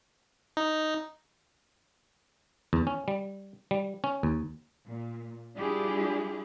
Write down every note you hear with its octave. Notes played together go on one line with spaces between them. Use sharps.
D#4
E2
C#4
G3
G3
C#4
D#2
A#2
G3 D4 E4 F4 G4 G#4